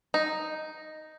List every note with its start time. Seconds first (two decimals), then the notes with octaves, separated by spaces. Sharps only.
0.14 D#4